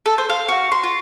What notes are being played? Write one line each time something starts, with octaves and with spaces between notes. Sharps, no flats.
A4
C5
F5
F#4
C6
F4